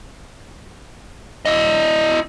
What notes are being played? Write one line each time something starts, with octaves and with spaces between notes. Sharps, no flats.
E4 D#5